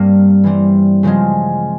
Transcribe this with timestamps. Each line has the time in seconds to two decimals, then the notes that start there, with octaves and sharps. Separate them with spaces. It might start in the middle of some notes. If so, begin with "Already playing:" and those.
Already playing: G2 G3 A#3 C4
0.44 E3 G3 C4
1.03 C#3 F3 G#3 C4